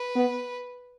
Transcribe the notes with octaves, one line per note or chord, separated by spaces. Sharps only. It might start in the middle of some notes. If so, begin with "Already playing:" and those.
Already playing: B4
B3